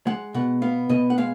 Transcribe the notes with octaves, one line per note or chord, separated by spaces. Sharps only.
G#3 F#5
B2 F#5
B3 F5
B2 D#5
F#5
G#3 F5